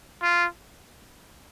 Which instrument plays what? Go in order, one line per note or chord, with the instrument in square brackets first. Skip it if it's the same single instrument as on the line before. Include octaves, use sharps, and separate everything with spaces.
[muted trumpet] F4